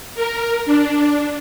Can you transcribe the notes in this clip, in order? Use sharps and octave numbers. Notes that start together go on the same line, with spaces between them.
A#4
D4